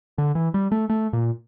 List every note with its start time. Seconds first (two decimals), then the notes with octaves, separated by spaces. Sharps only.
0.18 D3
0.35 E3
0.54 G3
0.72 A3
0.89 A3
1.13 A#2